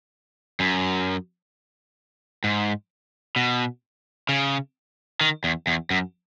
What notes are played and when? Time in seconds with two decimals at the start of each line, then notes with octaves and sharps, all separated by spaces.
0.60 F#2
2.44 G#2
3.36 B2
4.29 C#3
5.21 D#3
5.44 E2
5.67 E2
5.90 F#2